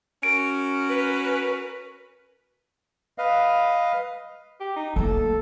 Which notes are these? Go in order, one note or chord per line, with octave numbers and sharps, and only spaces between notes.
C#4 F#4 A#4 D7
B4
B4 D#5 F5
G4
D#4
A3 A#3 A4